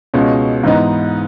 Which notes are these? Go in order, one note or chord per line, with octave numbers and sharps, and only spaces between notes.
C#2 B2 G#3 C#4
G#2 E3 B3 D#4